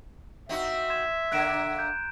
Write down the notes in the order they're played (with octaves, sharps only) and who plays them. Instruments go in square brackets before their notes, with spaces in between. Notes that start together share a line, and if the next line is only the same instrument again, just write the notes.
[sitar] C4 D#4 F#4 [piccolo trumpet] E5
[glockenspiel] C6 G#6 E7
[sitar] D3 A#3 [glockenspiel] F#6 D7 E7
[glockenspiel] A#5 G6